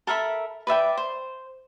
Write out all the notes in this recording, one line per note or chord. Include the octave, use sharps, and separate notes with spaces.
A4 A#4 E5 B5
B4 D5 E5 G5
C5